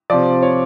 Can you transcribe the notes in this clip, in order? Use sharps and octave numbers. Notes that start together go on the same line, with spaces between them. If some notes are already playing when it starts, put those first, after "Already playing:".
C3 F3 D5
C#5